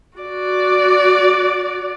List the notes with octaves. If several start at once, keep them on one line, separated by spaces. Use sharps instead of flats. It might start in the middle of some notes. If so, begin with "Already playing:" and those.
F#4 D5